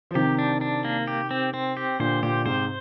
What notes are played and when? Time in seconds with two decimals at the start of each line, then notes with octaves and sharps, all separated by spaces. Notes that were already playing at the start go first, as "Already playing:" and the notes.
0.11 F3
0.15 C3 D#3 G4
0.39 D4
0.61 D4
0.85 A#3
1.08 G4
1.31 C4
1.54 C4
1.77 G4
1.99 A#2 D3 C5
2.22 A#2 D3 G4
2.45 G#2 C3 C5